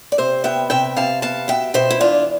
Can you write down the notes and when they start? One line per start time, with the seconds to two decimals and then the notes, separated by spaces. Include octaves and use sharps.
0.12 D5
0.18 C3 C5 E5
0.44 B3 E5 G5
0.70 C3 E5 G5
0.96 C3 F5 A5
1.22 B3 F5 A5
1.48 B2 E5 G5
1.74 B2 C5 E5
1.91 E4
2.01 E2 D4 F4